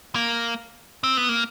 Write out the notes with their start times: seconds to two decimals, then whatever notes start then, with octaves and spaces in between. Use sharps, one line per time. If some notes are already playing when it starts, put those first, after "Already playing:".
0.15 A#3
1.04 C4
1.17 B3
1.29 A#3